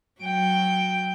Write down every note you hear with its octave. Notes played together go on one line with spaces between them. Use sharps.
F#3 G5